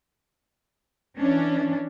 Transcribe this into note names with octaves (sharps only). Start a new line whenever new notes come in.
E3 C#4 D4